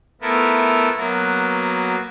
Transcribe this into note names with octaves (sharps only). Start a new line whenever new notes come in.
A3 B3 E4 F4 A4 A#4
F#3 A#3 B3 F#4